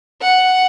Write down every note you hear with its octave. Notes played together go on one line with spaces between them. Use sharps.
F#5